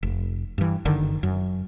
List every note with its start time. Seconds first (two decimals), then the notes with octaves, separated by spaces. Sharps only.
0.03 F1
0.58 G2 E3
0.85 F#1 D3 D#3
1.23 F#2